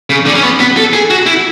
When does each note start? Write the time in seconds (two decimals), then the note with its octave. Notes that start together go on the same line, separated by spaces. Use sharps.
0.10 C#3
0.26 D3
0.35 C#4
0.43 B3
0.60 B3
0.77 A4
0.93 G#4
1.10 F#4
1.26 E4